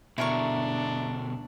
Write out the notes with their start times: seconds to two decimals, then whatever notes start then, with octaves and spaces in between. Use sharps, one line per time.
0.18 B2 D3 D4 E4 A#4 C#6